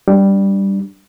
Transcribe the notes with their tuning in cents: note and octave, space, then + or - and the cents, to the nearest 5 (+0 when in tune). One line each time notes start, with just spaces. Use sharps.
G3 +0 D4 +0